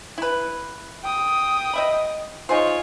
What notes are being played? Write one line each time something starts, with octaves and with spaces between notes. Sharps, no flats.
E4 B4
G5 D#6
D#5 E5 B5
D#4 F4 G#4 C5 C#5